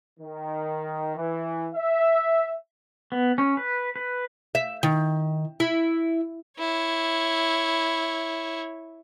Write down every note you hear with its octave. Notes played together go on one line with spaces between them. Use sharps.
D#3
E3
E5
B3
C#4
B4
B4
E5
D#3
E4
E4 C#5